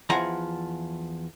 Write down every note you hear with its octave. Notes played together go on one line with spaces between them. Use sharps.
E2 F3 F#5 G#5 A#5